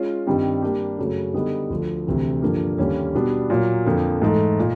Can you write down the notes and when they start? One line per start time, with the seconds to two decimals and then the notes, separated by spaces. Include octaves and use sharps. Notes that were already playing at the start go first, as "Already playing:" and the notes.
Already playing: G#3 C#4 F4
0.27 G2 D#3 G3 C4
0.62 G3 A#3 D4 G4
0.98 F#2 C#3 F#3 A3
1.34 D3 G3 B3 D#4
1.70 D2 D3 F3 A3
2.07 D2 C3 E3
2.42 G2 D3 F3 A#3
2.78 D#2 D3 G3 A#3 C#4
3.15 B2 G3 B3 D4
3.50 A#2 F#3 A#3
3.85 F2 D3 F3 A#3
4.22 G#2 E3 A3
4.59 A#2